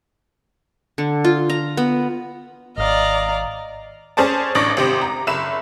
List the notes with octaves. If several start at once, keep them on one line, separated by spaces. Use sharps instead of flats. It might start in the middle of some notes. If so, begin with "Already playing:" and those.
D3
F4
A#5
B3
G#1 D5 D#5 F5 A#5
C#4 G#4 C5 D5 A5
A1 D4 C#6 D6 A#6
G#1 C3 G4 C5
A#5
F#1 E5 B5 E7